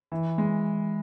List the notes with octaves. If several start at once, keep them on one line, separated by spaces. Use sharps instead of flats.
E3
G#3